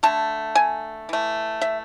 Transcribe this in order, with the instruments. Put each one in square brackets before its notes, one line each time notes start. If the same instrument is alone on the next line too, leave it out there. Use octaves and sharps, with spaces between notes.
[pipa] D3 A3 A5
G#5
E3 A3
E5